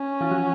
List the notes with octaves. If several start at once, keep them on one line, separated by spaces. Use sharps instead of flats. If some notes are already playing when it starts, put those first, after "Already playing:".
Already playing: C#4
E3 E4
F3 F4